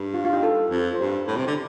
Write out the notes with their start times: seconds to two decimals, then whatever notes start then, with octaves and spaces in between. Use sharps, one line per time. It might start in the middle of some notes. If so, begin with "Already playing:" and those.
Already playing: G2
0.14 F4
0.25 F4
0.33 D#4 G4
0.43 F4 A4
0.71 F2
0.94 C5
0.99 G2 G4 A#4
1.28 A2
1.37 C3
1.47 D3